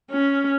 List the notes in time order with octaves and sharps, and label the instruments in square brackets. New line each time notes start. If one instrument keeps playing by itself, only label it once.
[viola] C#4